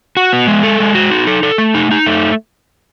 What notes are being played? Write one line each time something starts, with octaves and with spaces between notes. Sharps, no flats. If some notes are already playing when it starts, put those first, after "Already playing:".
F#4
B3
G#3
A4
G#3
F#4
D#4
A4
A4
A3
D#4
D#4
A3